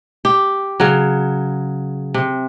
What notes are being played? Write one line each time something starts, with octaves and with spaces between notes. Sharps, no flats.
G4
C#3 F#3
C3